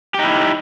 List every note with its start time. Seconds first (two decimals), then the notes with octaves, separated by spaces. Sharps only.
0.14 G4
0.19 D#4
0.23 E4